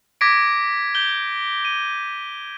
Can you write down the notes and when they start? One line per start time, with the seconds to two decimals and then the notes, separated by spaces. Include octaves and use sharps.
0.21 D6 G#6 A#6 B6 D7
0.95 G6 G7
1.65 D#7